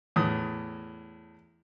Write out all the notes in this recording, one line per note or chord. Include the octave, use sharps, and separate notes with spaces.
E2 A2 D#6